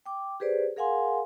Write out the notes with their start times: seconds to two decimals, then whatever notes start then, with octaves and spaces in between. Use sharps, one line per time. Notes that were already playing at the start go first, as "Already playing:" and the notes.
0.06 G5 D6
0.40 G4 G#4 B4 C5 D5
0.76 G#4 A#4 F5 F#5 G#5 C6